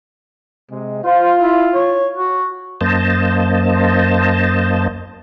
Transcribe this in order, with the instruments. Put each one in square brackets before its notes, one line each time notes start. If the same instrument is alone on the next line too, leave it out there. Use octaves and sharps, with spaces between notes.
[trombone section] C3 G#3
[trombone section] F4 [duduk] C5
[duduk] E4
C#5
F#4
[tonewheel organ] F#2 A#3 C5 D#5 A5